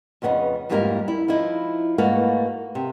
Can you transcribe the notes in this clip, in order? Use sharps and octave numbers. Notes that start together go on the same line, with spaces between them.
F2 C#3 B3 C#4 D#4
F2 G#2 G3 A#3 F4 A#4
E4
F3 D#4 E4
G#2 A3 A#3 F#4 B4 F5
C3